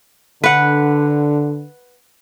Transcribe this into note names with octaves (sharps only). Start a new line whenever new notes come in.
D3 B4 F#5